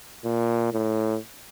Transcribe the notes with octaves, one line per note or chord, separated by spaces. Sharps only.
A#2
A2